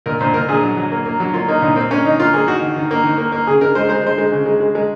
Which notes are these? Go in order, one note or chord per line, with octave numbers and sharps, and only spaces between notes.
A#2 A#4
A#2 C5
A#2 A#4
A#2 G#4
F#3
F#3
A#3
A#3
F#3
A#3 F4
A#3 D#4
A#2 D#4
A#3 C4
A#3 C#4
D#3 D#4
A#3 F4
A#3 G#4
D#3 F#4
D#3
D#3
A#3
D#3
A#3
A#3
C#3 G#4
C#3 A#4
G#3 C5
G#3 C5
G#3 C5
G#3
C#3
G#3
G#3
G#3